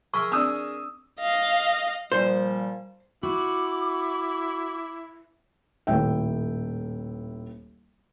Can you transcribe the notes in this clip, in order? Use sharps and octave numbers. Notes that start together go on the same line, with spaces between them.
G#4 A#4 E5 A#5 C#6
C4 D4 D5 D#6 E6
D#5 F5
A#2 F3 G3 C5
E4 F#4 D6
D#1 A2 E5 G5